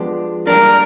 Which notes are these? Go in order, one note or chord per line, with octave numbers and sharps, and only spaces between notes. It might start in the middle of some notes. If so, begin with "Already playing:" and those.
Already playing: F3 G#3 B3 D4 G4
G3 A#3 D4 A#4